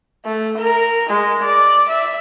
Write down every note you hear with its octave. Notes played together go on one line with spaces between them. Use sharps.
A3
A#4
G#3
D5
E5